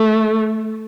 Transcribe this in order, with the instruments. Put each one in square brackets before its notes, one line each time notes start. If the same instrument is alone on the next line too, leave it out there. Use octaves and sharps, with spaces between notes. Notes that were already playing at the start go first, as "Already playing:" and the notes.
Already playing: [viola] A3